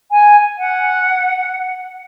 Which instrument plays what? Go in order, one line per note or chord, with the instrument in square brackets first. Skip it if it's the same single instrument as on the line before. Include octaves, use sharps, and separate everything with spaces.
[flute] G#5
F#5